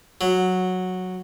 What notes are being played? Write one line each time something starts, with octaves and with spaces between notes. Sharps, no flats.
F#3